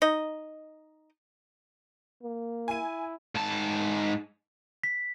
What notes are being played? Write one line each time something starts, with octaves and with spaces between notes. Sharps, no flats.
D#4 D#5
A#3
E4 G#5 D#7
G#2 A5
B6